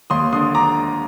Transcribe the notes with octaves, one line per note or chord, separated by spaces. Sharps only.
D#2 C6 D#6
D3 C6 D#6
A#5 D6